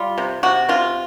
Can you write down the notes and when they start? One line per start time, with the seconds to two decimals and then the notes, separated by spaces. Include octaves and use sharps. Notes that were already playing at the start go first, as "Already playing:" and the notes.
Already playing: G3 F4
0.18 C3
0.43 C3 F#4
0.69 C3 F4